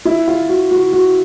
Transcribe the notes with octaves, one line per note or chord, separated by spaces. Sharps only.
E4
F4
F#4
F#4
F#4